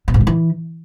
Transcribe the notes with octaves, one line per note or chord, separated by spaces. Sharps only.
B2
G#2
C#3
E3